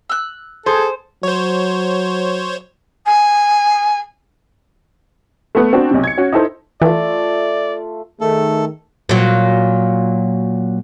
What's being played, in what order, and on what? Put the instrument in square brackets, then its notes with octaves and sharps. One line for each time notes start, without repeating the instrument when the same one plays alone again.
[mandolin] E6 F#6
[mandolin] G#4 [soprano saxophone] A4 [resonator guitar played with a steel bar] C5
[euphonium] F#3 [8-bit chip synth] C5 C#5
[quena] G#5
[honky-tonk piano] A3 B3
C4 D4 F#4
B1 C3
G#6 C#7
C#4 F#4
D#4 E4 A4 C5
[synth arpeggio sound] E3 [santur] A3 F4 [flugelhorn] D5
[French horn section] D#3 G#4 [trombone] A3 [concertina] A4
[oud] A#2 F#3